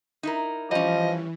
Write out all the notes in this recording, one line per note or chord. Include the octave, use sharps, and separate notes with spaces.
D#4 E4 A#4
E3 F3 G3 C#4 D#5